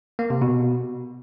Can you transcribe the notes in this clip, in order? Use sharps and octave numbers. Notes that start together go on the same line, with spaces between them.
A#3
C3
B2